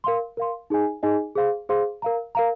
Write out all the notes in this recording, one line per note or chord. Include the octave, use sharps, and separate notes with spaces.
A#4 F5 C6
A#4 F5 C6
D#4 G#4 D#5 G#5
D#4 G#4 D#5 G#5
G#4 C5 F5 C6
G#4 C5 F5 C6
A#4 F5 A#5
A#4 F5 A#5